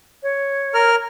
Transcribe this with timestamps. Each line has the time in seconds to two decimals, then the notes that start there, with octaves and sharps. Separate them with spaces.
0.23 C#5
0.74 A#4 F6